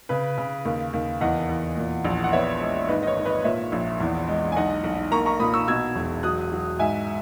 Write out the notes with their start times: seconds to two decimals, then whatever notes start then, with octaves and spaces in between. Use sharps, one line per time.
0.09 C#3 B4
0.38 C#3
0.65 D#2
0.93 D#2
1.21 E2 D#5 F#5
1.49 E2
1.77 A#2
2.05 A#1
2.24 F#5
2.32 B3 C#5 E5
2.60 G#3
2.89 G#1 B4 D#5
3.03 D#5
3.07 C#5
3.16 G#1
3.25 B4 D#5
3.44 A#2 C#5 E5
3.72 A#1
4.00 E2
4.27 G#3
4.52 G#5
4.56 B1 D#5 F#5
4.84 B1
5.11 A#3 A#5 C#6
5.26 A#5 C#6
5.40 A#2 B5 D#6
5.54 C#6 E6
5.67 B2 E6 G#6
5.95 E1
6.23 F#3 D#6 F#6
6.52 F#3
6.79 G#2 E5 G#5